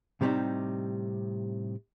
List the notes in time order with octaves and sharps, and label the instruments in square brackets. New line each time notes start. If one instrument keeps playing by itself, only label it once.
[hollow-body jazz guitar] A2 C3 G3 B3 C4 D#4